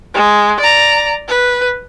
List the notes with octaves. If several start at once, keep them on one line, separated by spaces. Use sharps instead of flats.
G#3
D5 A#5
B4